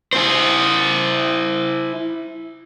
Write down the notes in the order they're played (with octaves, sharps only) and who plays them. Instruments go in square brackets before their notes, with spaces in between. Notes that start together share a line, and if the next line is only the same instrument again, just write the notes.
[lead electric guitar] E4 C5